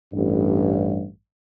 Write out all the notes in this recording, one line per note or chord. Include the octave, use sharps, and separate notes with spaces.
A1 G2